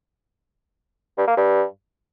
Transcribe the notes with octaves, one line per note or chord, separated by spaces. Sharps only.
G2
A#3
G2